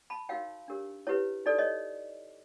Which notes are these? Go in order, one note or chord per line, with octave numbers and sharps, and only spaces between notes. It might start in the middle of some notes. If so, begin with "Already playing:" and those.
A5 B5
D#4 F#4 A#4 C#5 F5 G5
D4 G4 A#4 C#5
E4 G4 B4 C#5
D#4 F#4 A4 D5
C#5 D#5